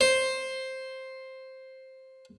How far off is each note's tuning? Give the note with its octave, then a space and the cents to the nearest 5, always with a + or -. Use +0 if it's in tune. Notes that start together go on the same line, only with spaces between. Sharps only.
C5 +5